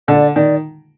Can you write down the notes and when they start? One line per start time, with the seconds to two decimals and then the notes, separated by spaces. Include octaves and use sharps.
0.08 D3 D5
0.36 D#3 D5